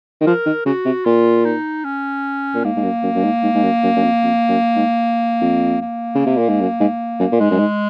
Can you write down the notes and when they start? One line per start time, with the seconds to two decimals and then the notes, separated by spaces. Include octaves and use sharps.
0.21 D#3
0.26 F3 A#4
0.46 D#3
0.66 C#3 F#4
0.85 C3
1.05 A#2 F4
1.45 D#4
1.85 C#4
2.54 A#2
2.64 G#2 A#3
2.76 G#2
2.84 F#2
3.03 F#2
3.15 F#2
3.24 G#2
3.43 G#2
3.55 G#2
3.64 F#2
3.84 F#2
3.96 F#2
4.04 F2
4.23 F2
4.49 F#2
4.76 G#2
5.41 F2
5.81 A#3
6.15 C#3
6.26 C3
6.37 A#2
6.49 G#2
6.61 F#2
6.80 G#2
7.20 F#2
7.32 A#2
7.40 G#2 G#3
7.51 F#2
7.59 G#2